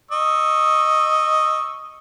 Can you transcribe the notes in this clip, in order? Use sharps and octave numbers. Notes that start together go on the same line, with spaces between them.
D#5 C#6 E6